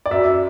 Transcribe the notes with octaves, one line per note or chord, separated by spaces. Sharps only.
D5
F#2 E5